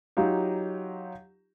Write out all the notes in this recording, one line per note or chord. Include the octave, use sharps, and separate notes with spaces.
F#3 D#4 F4 G4